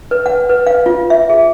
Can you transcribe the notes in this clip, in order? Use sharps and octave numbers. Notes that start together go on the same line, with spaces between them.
B4
F#5
B4
F5
F4
E5
G#4